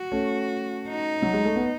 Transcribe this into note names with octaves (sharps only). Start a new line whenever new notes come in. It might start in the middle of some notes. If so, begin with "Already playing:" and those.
Already playing: F#4
A3 C#4
D#4
F#3
G#3
A3
B3